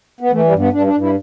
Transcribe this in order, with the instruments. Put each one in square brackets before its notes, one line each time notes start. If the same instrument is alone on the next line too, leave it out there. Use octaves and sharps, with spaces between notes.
[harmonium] B3
E3 A3
G3
G2
B3
G2 D4
D4
G2
E4